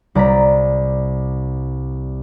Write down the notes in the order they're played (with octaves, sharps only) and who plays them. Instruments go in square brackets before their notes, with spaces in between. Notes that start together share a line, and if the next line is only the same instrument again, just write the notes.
[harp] C2 D5 A#5 A6 B6